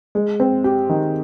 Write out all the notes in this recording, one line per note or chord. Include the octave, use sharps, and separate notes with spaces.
G#3
C4
G4
D#3